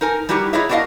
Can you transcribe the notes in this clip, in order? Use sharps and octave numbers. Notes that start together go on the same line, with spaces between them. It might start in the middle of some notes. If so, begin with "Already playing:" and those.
D#4 A#4 G#5
G3 D#4 E4 F#4 G4
E4 F4 G#4 C#5 D#5 E5
B3 D4 F#4 A#4 D#5 F5